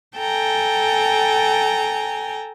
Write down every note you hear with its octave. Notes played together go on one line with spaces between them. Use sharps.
A4 G5 G#5 A#5